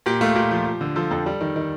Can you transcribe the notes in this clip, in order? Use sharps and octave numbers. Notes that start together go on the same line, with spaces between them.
A#2 G4
A3 F4
A#2 G4
F3
F3
D3
F3 A4
F2 A4
G3
D#3
D#3